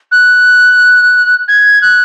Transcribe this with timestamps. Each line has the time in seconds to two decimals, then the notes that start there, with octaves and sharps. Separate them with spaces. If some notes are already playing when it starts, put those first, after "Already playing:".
0.12 F#6
1.48 G#6
1.82 F#6